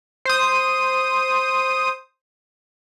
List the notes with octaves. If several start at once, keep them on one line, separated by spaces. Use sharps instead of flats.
C5 D#6